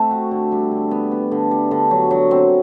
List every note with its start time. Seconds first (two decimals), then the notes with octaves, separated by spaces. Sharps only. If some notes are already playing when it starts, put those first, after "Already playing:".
Already playing: A3 C4
0.11 F#4
0.31 D3
0.52 G3
0.71 D3
0.91 B3
1.11 B3
1.31 D3
1.51 G3
1.71 D3
1.91 F#3
2.11 F#3
2.31 C4